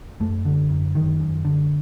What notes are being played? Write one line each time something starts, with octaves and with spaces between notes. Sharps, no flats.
F#2 A3
D3
F#2
F#2 D#3
F#2
D3